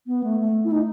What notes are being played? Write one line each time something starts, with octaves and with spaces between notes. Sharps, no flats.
B3
A3
A3
E4
D#4